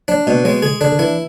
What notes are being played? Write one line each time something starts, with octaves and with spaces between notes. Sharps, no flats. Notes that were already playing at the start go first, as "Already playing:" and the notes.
F#3 D4
B2 G#3
F#3 G#3
D3 G#4
D3 D4
D3
E3 E4